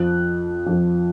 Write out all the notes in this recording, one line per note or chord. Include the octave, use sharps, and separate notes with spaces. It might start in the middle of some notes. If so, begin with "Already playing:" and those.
Already playing: F2 F3 F#6
F2 F3